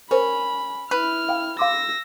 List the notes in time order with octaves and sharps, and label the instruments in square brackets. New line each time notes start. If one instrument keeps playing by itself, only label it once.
[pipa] C#4 [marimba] A#4 C5 [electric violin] B5
[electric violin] E4 F6 [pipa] B4
[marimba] F5 G5
[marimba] F5 C6 D6 [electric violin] E6 A#6